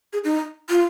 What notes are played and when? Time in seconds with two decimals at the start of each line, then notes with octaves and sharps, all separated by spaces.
0.13 G#4
0.24 D#4
0.70 F4